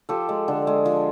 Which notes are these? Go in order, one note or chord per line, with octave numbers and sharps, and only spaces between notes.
F3 G4 A4
G#3
D3
G#3
F3